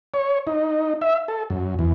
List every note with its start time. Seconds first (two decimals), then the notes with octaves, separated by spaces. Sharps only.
0.14 C#5
0.47 D#4
1.01 E5
1.28 A4
1.50 F#2
1.79 E2